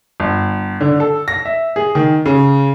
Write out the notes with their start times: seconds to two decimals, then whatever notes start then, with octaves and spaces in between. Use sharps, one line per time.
0.20 G1
0.81 D3
1.00 A4
1.28 A#6
1.45 E5
1.76 G#4
1.95 D#3
2.26 C#3